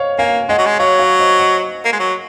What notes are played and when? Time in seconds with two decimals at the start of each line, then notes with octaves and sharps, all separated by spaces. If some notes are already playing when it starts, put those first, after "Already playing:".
Already playing: C5 C#5 D#5 F5
0.18 A#3 F5 G#5
0.49 G#3 D#5 F#5
0.58 F#3
0.66 G#3
0.79 F#3 C#5 F5
0.99 C#5 F5
1.19 C5 D#5
1.39 D#5 F#5
1.85 A#3
1.93 G#3
2.00 F#3